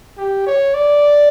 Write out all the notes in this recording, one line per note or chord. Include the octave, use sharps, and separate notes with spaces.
G4
C#5
D5